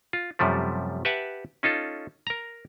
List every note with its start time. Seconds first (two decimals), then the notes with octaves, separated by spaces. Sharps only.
0.13 F4
0.39 F#2 C3 F3 G3 A3
1.05 G4 B4 E5 F#5 A5
1.63 C#4 D#4 F4 A4
2.27 A#4 A#5